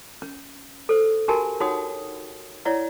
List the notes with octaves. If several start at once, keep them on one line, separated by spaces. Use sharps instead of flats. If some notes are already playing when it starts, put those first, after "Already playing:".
C#4
A4 C5
D4 F#4 G4 A#4 G#5 A5
D#4 F#4 C#5 F#5 G5 D#6
E4 C#5 D5 F#5